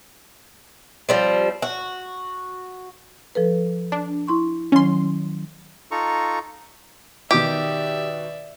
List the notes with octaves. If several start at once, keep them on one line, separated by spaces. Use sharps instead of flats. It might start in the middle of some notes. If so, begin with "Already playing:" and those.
F3 G3 C4
F#4
F3 A4 B4
D4
E4 C6 C#6
D#3 F#3 C#4 C6
D#4 F4 A4 A#5 C#6
B2 D#3 G4 D5 E5